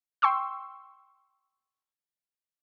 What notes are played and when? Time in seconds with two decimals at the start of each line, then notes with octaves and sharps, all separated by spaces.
0.22 G5 C6 C#6 E6